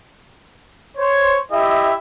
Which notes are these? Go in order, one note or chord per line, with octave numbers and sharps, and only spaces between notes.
C5 C#5
E4 G4 D#5 E5